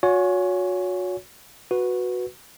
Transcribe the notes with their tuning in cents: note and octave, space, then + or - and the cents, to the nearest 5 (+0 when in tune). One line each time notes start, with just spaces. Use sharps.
F#4 -35 C#5 +25 G#5 +0
F#4 -10 B4 +0